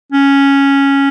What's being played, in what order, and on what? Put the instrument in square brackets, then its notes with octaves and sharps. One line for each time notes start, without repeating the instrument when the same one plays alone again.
[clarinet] C#4